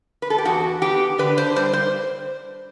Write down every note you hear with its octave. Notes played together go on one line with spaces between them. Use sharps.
B4
A4
G4
E2 F#4
B3 G4
D3 B4
C5
G3 C5
C5